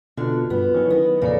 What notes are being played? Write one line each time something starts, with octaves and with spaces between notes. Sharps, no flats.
B2 D3 F4 F#4
G2 B3
D#3 F#3 C#4 E4
D#3 B3 A#4
F2 A#2 C#3 A#3 A4 C#5 D5